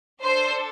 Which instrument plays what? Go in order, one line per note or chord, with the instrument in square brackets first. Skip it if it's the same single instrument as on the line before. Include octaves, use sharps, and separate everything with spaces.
[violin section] D4 A4 C5